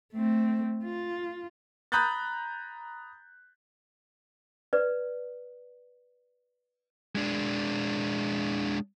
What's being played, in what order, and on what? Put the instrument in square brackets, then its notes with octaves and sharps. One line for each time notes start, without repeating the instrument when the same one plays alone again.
[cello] A3 C4
F4
[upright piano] A#5 B5 D#6 F#6 G6 A6
[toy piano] B4 D5
[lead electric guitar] G#3 D4